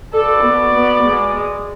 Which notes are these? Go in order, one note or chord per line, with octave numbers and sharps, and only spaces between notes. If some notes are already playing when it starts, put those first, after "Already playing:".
F#4 A4 B4 D5
B3
B3
G#3